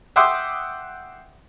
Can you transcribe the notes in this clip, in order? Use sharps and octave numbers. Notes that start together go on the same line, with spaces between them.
E5 F#5 G5 C6 D6 D#6